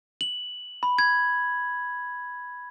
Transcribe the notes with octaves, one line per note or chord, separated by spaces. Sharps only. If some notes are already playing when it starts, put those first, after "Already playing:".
F#7
B5
G#6